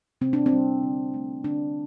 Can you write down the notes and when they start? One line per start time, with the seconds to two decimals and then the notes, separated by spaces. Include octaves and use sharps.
0.21 C3 C4
0.33 D4
0.46 C4
0.52 G3
0.83 D3
1.14 A3
1.44 D3 D4